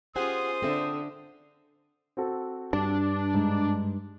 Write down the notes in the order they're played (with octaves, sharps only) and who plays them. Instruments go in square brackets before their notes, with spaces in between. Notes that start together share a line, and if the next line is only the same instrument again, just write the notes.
[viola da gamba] C#4 F4 G#4 [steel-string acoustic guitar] G4 F#5 G#5 [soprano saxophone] C5 [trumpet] D#6
[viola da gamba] D3 [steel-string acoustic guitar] C4 A4 E5
[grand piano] C4 F#4 A4
[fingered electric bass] G2 [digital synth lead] D4
[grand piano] G#2